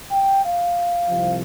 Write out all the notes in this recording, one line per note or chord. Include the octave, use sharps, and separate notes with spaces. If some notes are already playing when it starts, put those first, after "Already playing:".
G5
F5
C2 C3 F3